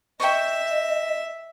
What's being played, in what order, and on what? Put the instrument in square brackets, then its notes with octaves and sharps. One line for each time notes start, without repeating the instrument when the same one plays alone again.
[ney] D#5 [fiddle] E5 [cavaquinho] G5 C#6